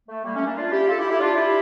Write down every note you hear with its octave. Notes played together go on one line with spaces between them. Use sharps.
A3
G3 A#3
A3 C#4
A#3 D4
D4 F4
E4 G4
F4 A4
E4 G4
E4 G4
D4 F4
E4 G4